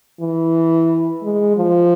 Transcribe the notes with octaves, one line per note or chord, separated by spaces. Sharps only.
E3
G#3
F3